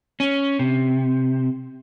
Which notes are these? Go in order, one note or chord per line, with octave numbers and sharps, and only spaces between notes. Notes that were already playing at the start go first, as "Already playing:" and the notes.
C#4
C3